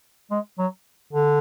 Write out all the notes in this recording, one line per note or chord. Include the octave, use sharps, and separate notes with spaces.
G#3
F#3
D3